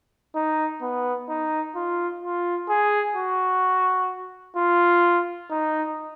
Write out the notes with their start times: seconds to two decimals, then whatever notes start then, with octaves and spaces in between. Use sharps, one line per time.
0.36 D#4
0.82 B3
1.29 D#4
1.75 F4
2.23 F4
2.69 G#4
3.16 F#4
4.57 F4
5.51 D#4